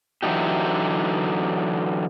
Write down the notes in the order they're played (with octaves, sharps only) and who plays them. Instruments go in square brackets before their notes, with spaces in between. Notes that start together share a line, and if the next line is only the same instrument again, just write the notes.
[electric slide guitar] D3 E3 F#3 A#3 D#4 G4